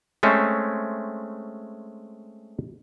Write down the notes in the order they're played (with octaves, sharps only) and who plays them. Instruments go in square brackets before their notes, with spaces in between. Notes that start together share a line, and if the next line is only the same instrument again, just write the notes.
[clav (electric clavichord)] G#3 A3 C4 C#4 C5